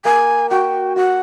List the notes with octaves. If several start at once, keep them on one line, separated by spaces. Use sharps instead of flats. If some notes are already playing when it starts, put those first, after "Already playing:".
A#3 G#5
F#4 G5
F#4 F#5